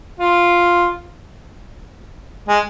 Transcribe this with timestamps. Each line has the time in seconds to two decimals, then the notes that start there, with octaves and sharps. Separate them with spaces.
0.19 F4
2.48 G#3